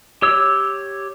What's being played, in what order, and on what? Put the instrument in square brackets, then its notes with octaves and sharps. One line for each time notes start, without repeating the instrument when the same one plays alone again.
[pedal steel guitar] G4 C#5 E6